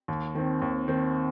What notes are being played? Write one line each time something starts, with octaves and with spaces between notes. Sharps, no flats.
D#2
D#3 C4
D#2
D#3 C4